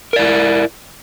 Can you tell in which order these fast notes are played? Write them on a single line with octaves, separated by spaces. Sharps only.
A#4 D5 E4